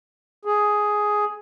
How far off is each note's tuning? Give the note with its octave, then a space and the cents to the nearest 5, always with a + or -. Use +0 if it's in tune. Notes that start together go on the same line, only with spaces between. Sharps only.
G#4 +5